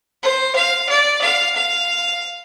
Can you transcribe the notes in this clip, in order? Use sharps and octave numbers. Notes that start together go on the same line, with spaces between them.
C5
F5
D5
F5
F5